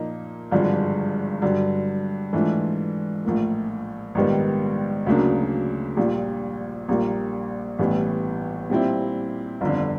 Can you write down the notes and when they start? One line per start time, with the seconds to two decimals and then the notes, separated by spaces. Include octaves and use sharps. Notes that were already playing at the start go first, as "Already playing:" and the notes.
Already playing: A#2 F3 A#3 D#4
0.51 G#1 G2 D3 F3 G#3
1.42 G2 D3 F#3
2.33 G#2 E3 A3 D4 F4
3.25 A#1 A2 F3 A#3
4.15 A#1 G#2 D#3 G3 B3
5.06 D2 C#3 F#3 A#3 D4
5.97 A#1 A#2 G3
6.88 A#1 A#2 G3 A#3
7.79 A1 A2 E3 G3 B3
8.70 A#2 G3 C4 E4
9.61 G1 F2 D3